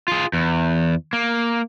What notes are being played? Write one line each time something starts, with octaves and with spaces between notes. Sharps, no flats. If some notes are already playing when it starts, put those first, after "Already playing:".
F4 G#4
E2
A#3